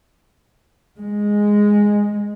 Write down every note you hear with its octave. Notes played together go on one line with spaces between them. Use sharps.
G#3